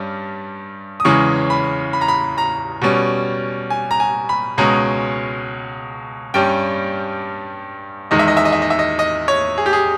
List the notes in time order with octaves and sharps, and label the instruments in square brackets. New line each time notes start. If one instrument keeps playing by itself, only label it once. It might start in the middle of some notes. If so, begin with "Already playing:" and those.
Already playing: [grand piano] G2 G3 C#4
D#6
E2 C#3 E3 G#3 C#4 C#6
B5
B5
A#5
B5
A#5
B2 G3 C#4
G#5
A#5
G#5
B5
C#2 B2 G#3 C#4 A#5
G2 G3 C#4 G5
E2 D#3 G#3 D#5
E5
D#5
E5
D#5
E5
D#5
E5
D#5
D#5
C#5
G#4
G4
G#4